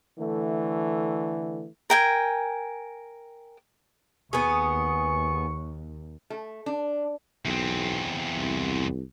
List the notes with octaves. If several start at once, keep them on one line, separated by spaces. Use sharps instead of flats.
D3 E3 A3
A#4 G5 G#5
D#2 B3 G#4 C#6
A3
D4
B1 E2 C4
C2